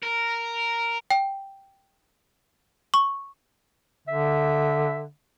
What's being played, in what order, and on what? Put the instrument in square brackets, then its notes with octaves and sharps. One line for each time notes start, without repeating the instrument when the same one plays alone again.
[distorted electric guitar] A#4
[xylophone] G5
C#6
[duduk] D3 [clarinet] E5